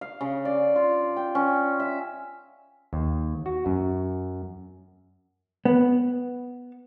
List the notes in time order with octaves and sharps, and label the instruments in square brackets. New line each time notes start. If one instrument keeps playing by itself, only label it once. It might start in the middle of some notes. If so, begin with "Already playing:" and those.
[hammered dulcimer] F5
C#3
D5
F4
G5
C#4
E5
[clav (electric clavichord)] D#2
F#4
F#2
[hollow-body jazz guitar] B3